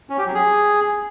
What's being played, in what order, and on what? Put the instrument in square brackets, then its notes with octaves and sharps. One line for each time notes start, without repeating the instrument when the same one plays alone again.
[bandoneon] C#4
G4
F#3
G#4